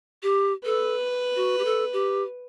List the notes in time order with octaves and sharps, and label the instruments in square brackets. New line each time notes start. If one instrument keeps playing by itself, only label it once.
[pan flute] G4
[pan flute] A4 [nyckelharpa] B4
[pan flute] F#4
G4
A4
G4